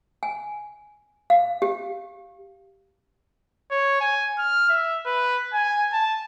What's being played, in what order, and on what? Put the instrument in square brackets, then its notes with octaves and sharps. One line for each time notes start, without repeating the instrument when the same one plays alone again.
[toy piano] G#5
F5
G4
[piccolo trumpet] C#5
G#5
F6
E5
B4
G#5
A5